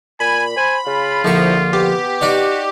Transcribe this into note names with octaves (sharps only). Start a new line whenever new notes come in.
A#2 G#5 B5
C5 G#5
C#3 F4
A#1 D3 F3 E4 C#6
B3 G4
D4 D#4 F#4 D5